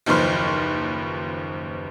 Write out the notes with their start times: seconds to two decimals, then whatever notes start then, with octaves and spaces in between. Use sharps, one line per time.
0.06 F#1 D#2 F3 B4 C6 F6